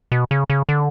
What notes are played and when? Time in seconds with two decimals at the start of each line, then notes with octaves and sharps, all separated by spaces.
0.12 B2
0.31 C#3
0.50 C#3
0.69 D3